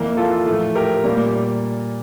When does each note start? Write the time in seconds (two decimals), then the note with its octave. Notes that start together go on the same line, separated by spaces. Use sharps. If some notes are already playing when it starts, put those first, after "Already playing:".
Already playing: F2 E3 A#3
0.17 F4 A4
0.46 A2 F3 A3
0.75 G4 A#4
1.04 A#2 G3 A#3